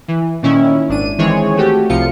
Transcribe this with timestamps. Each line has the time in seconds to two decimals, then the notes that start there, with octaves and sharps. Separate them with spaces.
0.08 E3
0.42 A#2 D#3 C#4 E4
0.88 G#1 D4 D#7
1.18 D#3 E3 G#3 C4 G#4 C#5
1.57 A3 F#4 G4
1.89 C2 C3 F3 F4 C#7